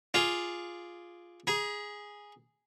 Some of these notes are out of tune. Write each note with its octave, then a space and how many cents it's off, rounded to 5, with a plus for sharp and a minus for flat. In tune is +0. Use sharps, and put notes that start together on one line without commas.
F4 +0 G#4 +0 D5 +0
G#4 -5 A#5 +45